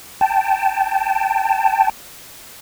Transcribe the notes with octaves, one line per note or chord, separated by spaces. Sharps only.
G5 A5